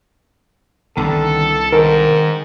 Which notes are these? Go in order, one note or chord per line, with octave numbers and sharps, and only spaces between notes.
C2 D3 D#3 B3 A4
G#2 D#3 A#4